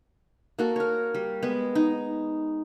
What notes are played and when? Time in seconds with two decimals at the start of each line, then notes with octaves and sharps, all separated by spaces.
0.59 A#3 F#4 A4
0.76 A#4 C#5
1.14 G3
1.43 G#3 B3
1.75 D#4